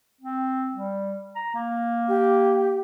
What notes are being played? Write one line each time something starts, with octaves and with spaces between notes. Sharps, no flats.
C4
G3
A#5
A#3
G4